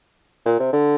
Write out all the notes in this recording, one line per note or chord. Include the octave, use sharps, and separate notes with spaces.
A#2
C3
D3